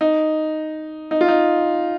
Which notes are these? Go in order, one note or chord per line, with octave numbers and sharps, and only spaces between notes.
D#4
D#4
F4
D#4